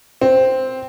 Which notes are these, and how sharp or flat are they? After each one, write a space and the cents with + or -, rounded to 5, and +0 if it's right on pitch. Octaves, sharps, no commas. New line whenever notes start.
C4 -5